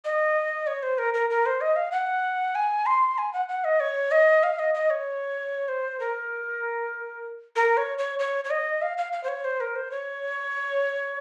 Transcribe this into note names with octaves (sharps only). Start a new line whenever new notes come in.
D#5
C#5
C5
A#4
A#4
A#4
C5
D#5
F5
F#5
G#5
C6
G#5
F#5
F#5
D#5
C#5
D#5
F5
D#5
D#5
C#5
C5
A#4
A#4
C#5
C#5
C#5
C#5
D#5
F5
F5
F5
C5
C#5
C5
A#4
C5
C#5